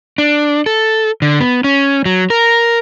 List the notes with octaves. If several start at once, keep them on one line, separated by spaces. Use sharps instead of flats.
D4
A4
D3
B3
C#4
F#3
A#4